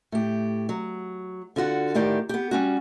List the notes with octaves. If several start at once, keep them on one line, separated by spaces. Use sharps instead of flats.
A2 G4
F#3
D3 F4 F#4 F#5
D2 A2 D#3 G4 D5
B3 G4
G3 C#4 F#4